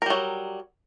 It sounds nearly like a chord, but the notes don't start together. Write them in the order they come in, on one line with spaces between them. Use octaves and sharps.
A#4 G3 F#3